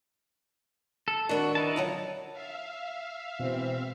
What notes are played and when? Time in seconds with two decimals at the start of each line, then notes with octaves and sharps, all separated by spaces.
1.08 A4
1.29 D#3 D4 F#4 B4
1.55 D#4 E4 A5
1.76 F2 D3 F#3
2.32 E5 F5
3.39 B2 E3 G#3 C4